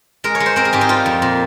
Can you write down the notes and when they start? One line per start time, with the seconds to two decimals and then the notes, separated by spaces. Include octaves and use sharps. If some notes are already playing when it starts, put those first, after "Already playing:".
0.24 G#3 A#4
0.35 C#5
0.40 G#3
0.46 C5
0.56 C4 A#4
0.65 G#4
0.73 G#2 G4
0.81 D#4
0.89 G3 F4
1.06 F2
1.22 A#2